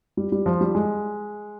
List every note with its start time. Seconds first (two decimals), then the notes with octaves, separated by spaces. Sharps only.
0.17 G3
0.32 G3
0.46 F3
0.61 G3
0.75 G#3